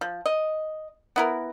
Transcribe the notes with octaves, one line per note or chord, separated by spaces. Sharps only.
F3
D#5
B3 E4 A#4